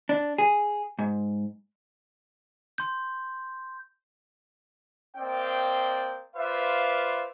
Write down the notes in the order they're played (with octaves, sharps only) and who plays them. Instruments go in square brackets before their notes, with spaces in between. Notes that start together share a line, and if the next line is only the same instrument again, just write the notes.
[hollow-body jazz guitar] D4
G#4
G#2
[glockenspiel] C6 G6
[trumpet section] A#3 C4 D5 D#5 G5
F4 B4 C5 D5 E5 F5